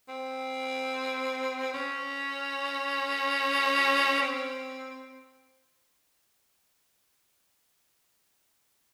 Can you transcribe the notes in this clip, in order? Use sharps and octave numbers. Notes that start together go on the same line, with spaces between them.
C4
C#4
C4